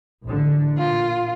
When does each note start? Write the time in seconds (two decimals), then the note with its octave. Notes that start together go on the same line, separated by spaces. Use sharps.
0.24 A1 D3
0.78 A#2 F4